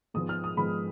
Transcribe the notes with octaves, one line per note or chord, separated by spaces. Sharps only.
G#2 F3 G#3 B3 D#6
F6
D#6
G#2 F3 G#3 B3 B5